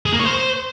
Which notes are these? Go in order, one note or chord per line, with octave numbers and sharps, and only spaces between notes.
G#4
A#3
C#5
C5